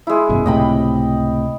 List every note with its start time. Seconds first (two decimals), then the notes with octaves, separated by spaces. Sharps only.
0.07 G#3 E4
0.29 G#1 F#2 B2
0.46 C#2 A2 C3 D#5 G5 B5